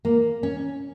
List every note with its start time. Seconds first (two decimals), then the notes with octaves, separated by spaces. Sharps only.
0.05 A#3
0.43 C#4